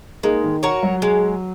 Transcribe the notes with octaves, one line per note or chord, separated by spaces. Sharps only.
G#3 A#3 D#4
D#3
F#4 A#4 C#5
F#3
G#3